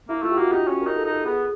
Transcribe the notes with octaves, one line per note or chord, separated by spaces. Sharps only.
A#3 E4
A3 F4
G4
A#3 F#4
D#4 G4
C#4
A#4
D#4
A4
D#4
A4
B3 G#4